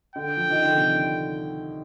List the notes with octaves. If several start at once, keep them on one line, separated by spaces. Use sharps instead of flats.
D3 G5
F3
D#3
D3
C3